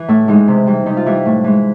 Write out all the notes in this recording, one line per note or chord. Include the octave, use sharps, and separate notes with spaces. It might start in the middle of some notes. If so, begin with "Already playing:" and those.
Already playing: E3
A2 E4
E3 G#3 D#4
C3
E3 G3
C3 D#4
F4
E3 G3 E4
A2
E3 G#3